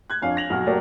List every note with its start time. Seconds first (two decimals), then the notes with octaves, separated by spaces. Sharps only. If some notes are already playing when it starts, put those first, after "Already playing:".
0.10 F#6 G#6
0.22 F2 D4 C#5 F5 G#5
0.37 A#6 F7 F#7
0.50 B1 F#4 F#5 F6
0.67 F#3 A3 A#3 G4 A#4 D5